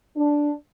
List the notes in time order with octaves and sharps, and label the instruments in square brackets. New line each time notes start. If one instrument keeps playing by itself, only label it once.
[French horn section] D4